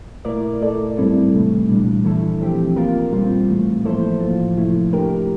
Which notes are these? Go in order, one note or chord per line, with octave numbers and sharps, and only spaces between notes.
A#2 A3 E4 A#4 D5
A3 E4 A4 D5
A2 G3 C4 E4 A4
C3 E3 A3
A#2 G3 D4
E3 A3 E4 A4
F3 C4 G4
A#3 F4 A#4
A#2 G3 C4 F4
A2 E3 A3
F3 A#3 E4 A4 C5
A2 F3 A#3 F4
C3 F3 A3 E4
A3 D4 G4 A#4